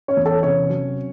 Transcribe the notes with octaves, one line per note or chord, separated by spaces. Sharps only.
C#4 C#5
E2
A4
C3 C#4 C#5
F#3